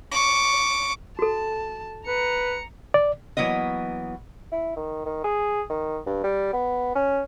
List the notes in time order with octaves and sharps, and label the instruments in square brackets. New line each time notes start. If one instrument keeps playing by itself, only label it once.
[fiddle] C#6 D6
[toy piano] F#4 A4 [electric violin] A5
[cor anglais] B4 [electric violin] A#5 C#7
[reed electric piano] D5
[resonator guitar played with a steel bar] E3 F#3 A#3 B3 D#5
[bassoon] E4
D#3
D#3
G#4
D#3
G2
G3
B3
C#4